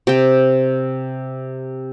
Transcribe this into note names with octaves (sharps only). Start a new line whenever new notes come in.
C3 G5